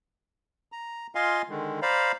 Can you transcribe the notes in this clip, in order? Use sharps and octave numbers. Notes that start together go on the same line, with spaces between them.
A#5
F4 D#5 F5 G#5 C6
D3 D#3 G#3
C5 D5 F5 A#5 B5